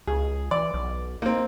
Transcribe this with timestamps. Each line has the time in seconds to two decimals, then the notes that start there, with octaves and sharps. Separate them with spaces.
0.07 C#2 G#4
0.51 E3 D5
0.74 B1
1.22 A#3 C4 D#4